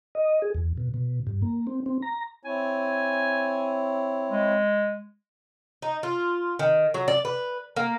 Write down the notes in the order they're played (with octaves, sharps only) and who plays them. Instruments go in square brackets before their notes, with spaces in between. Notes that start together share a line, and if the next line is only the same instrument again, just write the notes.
[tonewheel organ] D#5
G#4
E2
B2
B2
G2
A#3
C4
C4
A#5
[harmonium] C4 E4 C#5 [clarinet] G#5
[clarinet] G#3
[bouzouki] D#4
F4
D#3
F#3
D5
B4
A#3